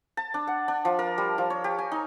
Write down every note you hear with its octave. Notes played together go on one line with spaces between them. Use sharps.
A5
D4
F#5
D4
F3
A#4
G3
F3
C#5
G4
G#5
D#4